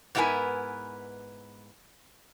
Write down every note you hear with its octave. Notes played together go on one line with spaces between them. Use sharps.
G#2 B3 E4 A#4 B4 G#5